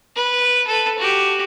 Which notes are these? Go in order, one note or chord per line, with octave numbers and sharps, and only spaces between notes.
B4
A4 B4
F#4 G4